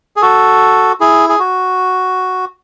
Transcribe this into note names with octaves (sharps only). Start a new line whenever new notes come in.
G#4
F#4 A4
E4 G#4
G#4
F#4